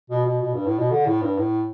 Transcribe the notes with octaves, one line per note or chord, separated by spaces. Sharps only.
B2
B2
B2
G2
A2
B2
D3
A2
G2
A2